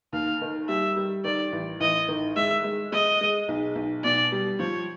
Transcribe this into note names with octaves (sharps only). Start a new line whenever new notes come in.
D#2 F5
D#3
G3 E5
G3
D#3 D5
A1
A1 D#5
D#3
G#3 E5
G#3
G#3 D#5
G#3
B1
B1
B2 D5
G3
F3 C#5